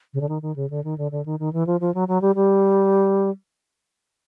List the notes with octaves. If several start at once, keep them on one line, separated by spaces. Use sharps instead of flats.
C#3
D3
D#3
D#3
C#3
D3
D#3
D3
D3
D#3
D#3
E3
F3
F3
F#3
F#3
G3
G3